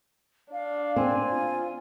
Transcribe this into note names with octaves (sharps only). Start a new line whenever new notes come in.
D4 F5
C4 G#5
F4